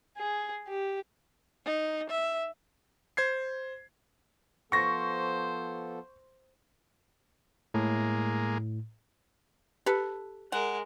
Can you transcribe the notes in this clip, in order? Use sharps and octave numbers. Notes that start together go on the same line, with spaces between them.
G#4
G4
D#4
E5
C5 G#6 C7
F3 B3 A4 C5 C#6 A#6
A2 G#3 A#3
G4 A4 B4
G#3 A#4 F#5